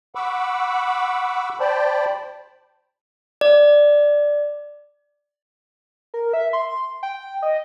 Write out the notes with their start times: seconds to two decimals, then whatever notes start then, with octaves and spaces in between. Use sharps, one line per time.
0.15 F#5 B5 C#6 D6 E6
1.60 C5 D5 G5 A5 B5
3.41 D5
6.14 A#4
6.33 E5
6.53 C6
7.03 G5
7.42 D#5